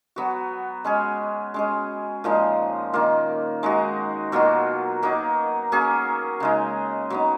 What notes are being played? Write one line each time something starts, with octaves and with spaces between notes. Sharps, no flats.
F#3 B3 F#4
G#3 C#4 G#4
G#3 C#4 G#4
A#2 F3 G#3 D#4
D#3 A#3 F4
G#3 D#4 F#4
B2 F#3 A#3 F4
F#3 A#3 D#4
F#3 A#3 C#4 G#4
C#3 G#3 D#4
F#3 B3 D#4